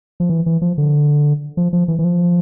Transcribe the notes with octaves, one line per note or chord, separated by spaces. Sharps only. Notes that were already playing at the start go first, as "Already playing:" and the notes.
F3
E3
E3
F3
D3
F3
F3
E3
E3
F3